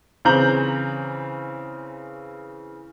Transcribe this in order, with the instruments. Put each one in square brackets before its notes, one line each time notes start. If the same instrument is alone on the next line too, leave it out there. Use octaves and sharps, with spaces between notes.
[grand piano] C#3 E3 C4 A#5 G6 F#7